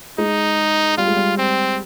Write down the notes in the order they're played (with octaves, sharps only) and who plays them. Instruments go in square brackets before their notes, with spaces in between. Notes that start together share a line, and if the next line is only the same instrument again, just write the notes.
[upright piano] G#3 [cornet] D#4
[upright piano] G3 [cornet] F4
[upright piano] G#3
G3
[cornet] C4